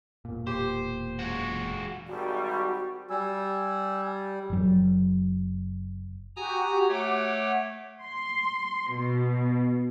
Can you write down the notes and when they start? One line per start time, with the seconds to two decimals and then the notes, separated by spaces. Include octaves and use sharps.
0.25 E1 A#2
0.47 G4 C5
1.19 G#3 F#4
2.08 G#1 G3 F#4
3.10 G3 G#5 E6
4.50 F#1 F#3
6.36 F#4 G4 G#5 A#5 D#6
6.89 A3 C#5 F#5 D6
8.01 C6
8.92 B2